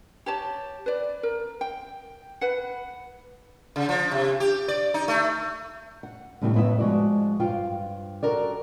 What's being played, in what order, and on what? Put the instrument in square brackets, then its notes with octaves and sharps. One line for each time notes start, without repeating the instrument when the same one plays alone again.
[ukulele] G4 C#5 A5
B4 D5
A#4
G5
B4 F#5
[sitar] C#3
F3
C3
G4
D5
D#4
A3
[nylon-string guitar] F#5
A2 D#3 G3 A3 C4 E4
F2 A2 B3 E4 E5
F3 G#3 F#4 D5
G2 F4 C5 F5 G5
F#4 A4 A#4 D5